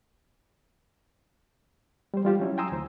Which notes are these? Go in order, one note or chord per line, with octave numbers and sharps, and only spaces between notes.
G3 C5
G3 F4 G4 C5
F#3 C#4 E4
G5 G#5 A#5 C6 D#6 E6
D2 C5